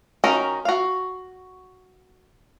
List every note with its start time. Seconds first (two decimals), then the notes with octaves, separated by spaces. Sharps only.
0.24 D#3 C#4 D#4 F#4 A#4
0.65 F#4 F5